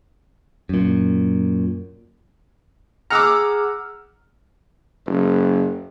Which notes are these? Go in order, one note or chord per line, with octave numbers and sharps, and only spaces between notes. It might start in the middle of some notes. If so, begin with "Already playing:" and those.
F#2 A#2
G#4 F#5 A#5 D6 E6 F6
F#1